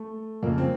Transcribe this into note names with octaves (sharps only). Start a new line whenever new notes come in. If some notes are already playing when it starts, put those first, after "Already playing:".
Already playing: A3
F2 C#3 A#3
C4